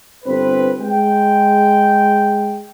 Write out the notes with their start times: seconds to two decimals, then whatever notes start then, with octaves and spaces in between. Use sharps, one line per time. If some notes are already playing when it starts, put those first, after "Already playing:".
0.25 G1 C4 B4
0.80 G#3 G5